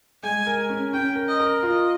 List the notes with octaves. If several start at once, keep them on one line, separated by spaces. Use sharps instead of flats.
G#3 G#5
A#4
C#4
C#4 G5
A#4
D#5
A#4
F4 D#5